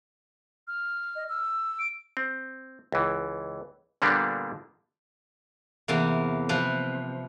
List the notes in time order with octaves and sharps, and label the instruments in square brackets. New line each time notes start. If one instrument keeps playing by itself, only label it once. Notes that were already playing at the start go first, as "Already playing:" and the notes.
[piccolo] F6
[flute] D#5
E6
[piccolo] D7
[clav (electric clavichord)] C4
C#2 E3
A#2 D3 G3 A#3 B3 D4
[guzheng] E2 C3 A#3
C3 F3 B4